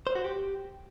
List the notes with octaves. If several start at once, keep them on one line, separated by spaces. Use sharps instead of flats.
C5
F#4
G4